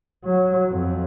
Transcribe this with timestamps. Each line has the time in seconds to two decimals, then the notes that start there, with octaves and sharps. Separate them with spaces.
0.25 F#3
0.70 F2